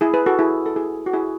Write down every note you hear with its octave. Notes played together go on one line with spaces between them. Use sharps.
E4 G#4
G#4 B4
F#4 A4
E4 G#4
A4
E4 G#4
F#4
E4 G#4